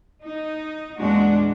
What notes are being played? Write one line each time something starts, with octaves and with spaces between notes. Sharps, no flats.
D#4
E2 A#2 G#3 D4 F#4